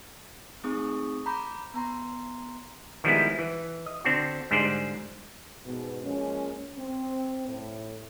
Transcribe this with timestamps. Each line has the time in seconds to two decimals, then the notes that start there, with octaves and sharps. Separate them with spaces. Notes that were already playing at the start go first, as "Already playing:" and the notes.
0.64 A3 C4 D#4 G#4 C#6 D#6
1.26 A#5 B5 D6 G6 B6
1.74 B3 A#5 C6
3.04 D#3 F3 G3 G#3 B3 E4
3.39 E3
3.86 D#5
4.04 D3 C4 D4 F#4
4.51 G#2 D3 G3 G#3 C5 D5
5.66 G#2 B2
6.03 F3 G#3 A#3 C#4
6.79 C4
7.49 A2